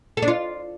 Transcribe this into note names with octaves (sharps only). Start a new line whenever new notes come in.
A4
D4
F4